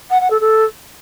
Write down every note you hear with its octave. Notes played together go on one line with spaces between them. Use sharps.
F#5
F#5
A4
A4